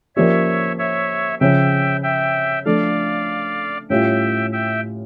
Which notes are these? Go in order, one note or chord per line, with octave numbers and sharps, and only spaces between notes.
F3 A#3 C#4 G4 C#5 D5 E5
C#5 E5
C#3 F3 C#4 E5 G5
E5 G5
F3 A3 D4 A4 D5 F5
A2 G3 C#4 F4 E5 G5
E5 G5